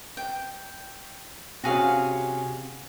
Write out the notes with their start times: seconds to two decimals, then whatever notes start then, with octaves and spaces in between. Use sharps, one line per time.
0.17 G5
1.64 C3 C#4 F#4 G#4 F5